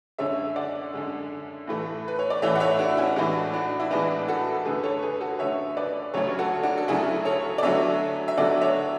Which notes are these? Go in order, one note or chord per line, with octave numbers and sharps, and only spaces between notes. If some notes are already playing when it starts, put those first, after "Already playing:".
F#2 D3 G#3 C#5 E5
D5 F#5
F#2 D3 G#3
A2 E3 A3
B4
C#5
D5
A2 E3 A3 C#5 E5
F#5
C#5 E5
D4 F#4
C#4 E4
A2 E3 G#3 D4 F#4
D4 F#4
E4
A2 E3 G#3 B3 D4
F#4 A4
A4
F#2 D3 A3 G#4 B4
A4 C#5
G#4 B4
F#4 A4
F#2 D3 A3 C#5 E5
B4 D5
D2 C#3 F#3 A3 A4 C#5
F#4 A4
D4 F#4
A4
D2 C#3 F#3 A3 E4 G#4
A4 C#5
D5
E2 D3 F#3 A3 C#5 E5
E5
E2 D3 F#3 A3 D5 F#5
C#5 E5